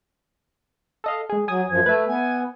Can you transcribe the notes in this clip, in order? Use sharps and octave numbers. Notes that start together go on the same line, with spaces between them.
A4 D#5 F5
G#3 G#4
F#3 G#5 D#6
F#2 F3 G#6
A3 B4 E5
B3 G#5